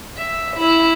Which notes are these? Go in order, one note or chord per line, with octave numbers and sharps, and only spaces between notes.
E5
E4